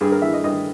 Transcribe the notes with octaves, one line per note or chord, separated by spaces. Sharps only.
G2 G#4
A#4
E3 E5
D#5
G2 D#5